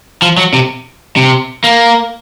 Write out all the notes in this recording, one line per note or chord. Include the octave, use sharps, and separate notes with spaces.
F3
F#3
C3
C3
A#3